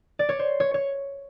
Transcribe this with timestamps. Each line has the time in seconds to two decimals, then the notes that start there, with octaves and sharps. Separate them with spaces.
0.19 D5
0.29 C#5
0.39 C5
0.60 C#5
0.74 C#5